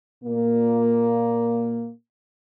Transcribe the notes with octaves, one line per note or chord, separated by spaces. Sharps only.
A#2 A#3